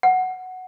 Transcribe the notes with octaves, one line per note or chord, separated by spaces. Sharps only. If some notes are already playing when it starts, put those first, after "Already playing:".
F#5